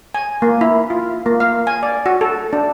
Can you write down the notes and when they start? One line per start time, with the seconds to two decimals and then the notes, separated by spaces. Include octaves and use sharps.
0.14 G#5
0.42 A#3
0.61 E4
0.90 F4
1.26 A#3
1.40 F5
1.67 G#5
1.83 D5
2.06 F#4
2.21 A4
2.53 D4